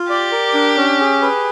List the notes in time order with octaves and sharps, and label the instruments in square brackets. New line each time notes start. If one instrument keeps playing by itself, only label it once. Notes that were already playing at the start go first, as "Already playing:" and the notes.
Already playing: [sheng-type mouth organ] F4
[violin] G4 [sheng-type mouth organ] D5
[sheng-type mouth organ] A#4
D4
C#4
G#4
B4